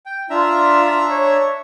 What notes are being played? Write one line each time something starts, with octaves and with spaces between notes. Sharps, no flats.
G5
D4 F4 E5 A#5
C#5